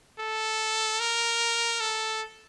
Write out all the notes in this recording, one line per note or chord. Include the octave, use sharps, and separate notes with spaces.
A4
A#4
A4